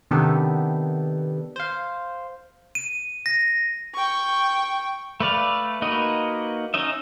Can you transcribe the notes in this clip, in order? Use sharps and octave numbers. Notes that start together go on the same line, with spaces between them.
C3 D#3 B3 D4 G4 A4
C5 F5
D#7
A#6
G5 C#6
A3 B4 D5 F5
A#3 D#4 F#4 B4 D#5
C#4 D#4 D#5 E5